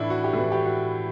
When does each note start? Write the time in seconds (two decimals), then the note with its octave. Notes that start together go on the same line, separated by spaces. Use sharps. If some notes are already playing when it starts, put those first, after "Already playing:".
Already playing: A2 E3 D4 E4
0.10 F#4
0.24 G4
0.33 A2 E3 F#4
0.52 G4
0.65 F#4